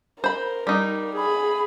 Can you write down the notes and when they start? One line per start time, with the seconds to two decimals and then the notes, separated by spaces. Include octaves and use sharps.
0.24 A#4 C5 B5
0.67 G3 D#4
1.16 G#4 B5